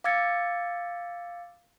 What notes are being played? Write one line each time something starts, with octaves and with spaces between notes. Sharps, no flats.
F5 D6 E6 G#6 A6 C#7